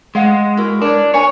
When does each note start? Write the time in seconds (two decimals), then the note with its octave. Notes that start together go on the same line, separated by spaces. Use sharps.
0.15 G#3 D#5 F5 F#5
0.57 E4 F#4 A#4
0.82 D4 A#4 C#5
1.14 A#4 C#5 G#5 A#5